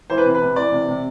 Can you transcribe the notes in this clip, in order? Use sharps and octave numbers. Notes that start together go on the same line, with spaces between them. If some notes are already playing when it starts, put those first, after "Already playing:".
E3 C5
B4
C3
B4
C3
E3 D5
C3
C3